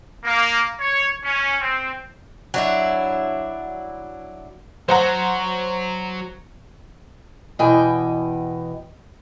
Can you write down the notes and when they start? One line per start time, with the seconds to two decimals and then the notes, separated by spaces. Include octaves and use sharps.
0.25 A#3
0.80 C#5
1.24 C#4
1.61 C4
2.54 F#3 D4 E4
4.89 F#3 C5 F#5 A#5
7.59 E2 B2 E3 D#5 G5 G#5